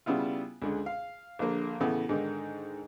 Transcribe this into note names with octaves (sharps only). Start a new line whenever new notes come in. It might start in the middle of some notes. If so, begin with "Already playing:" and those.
C#3 G3 B3 E4 F4
C#2 D3 G#4
F5
A#1 D3 A#3
A2 C#3 E3 A3 B3
G#2 D3 D#3